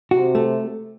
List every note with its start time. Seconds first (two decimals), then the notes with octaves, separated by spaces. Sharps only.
0.11 C3 F#4
0.35 A3